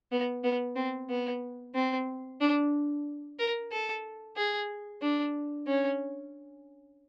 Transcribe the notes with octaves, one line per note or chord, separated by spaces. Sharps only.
B3
B3
C4
B3
C4
D4
A#4
A4
G#4
D4
C#4